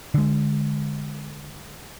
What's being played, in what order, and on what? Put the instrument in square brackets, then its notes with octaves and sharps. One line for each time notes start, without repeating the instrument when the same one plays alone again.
[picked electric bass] D3 G#3